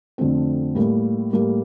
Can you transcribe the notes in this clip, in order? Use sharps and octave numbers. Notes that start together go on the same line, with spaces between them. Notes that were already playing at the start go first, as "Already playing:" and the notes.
F2 D3 A3 C4
A2 G3 A#3
A2 G3 A#3